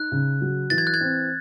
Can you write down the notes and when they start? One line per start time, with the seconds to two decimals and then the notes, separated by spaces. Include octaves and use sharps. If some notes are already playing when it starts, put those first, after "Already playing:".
Already playing: D#4 F#6
0.12 C#3
0.41 F#3
0.70 E3 A6
0.78 G#6
0.87 F#6
0.94 G#6
1.01 C4